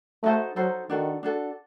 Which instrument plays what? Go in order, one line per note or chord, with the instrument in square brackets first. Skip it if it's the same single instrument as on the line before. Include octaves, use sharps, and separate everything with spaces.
[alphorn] A3 [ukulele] D#4 F#4 A4 C5
[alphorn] F#3 [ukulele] D#4 F#4 A4 C5
[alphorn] D#3 [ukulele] D4 F#4 A4
[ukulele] D4 F#4 A4